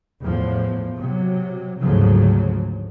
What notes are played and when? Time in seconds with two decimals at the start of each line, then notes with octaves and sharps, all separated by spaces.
0.21 E2 A2 F3
0.95 C3 F#3
1.79 D2 G#2 C#3 F3 F#3